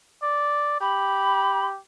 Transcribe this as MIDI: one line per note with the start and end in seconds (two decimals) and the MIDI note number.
0.22 0.76 74
0.81 1.78 67
0.81 1.66 83